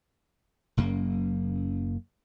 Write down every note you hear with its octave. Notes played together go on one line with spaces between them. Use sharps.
F#1 F#2 C#3 A#3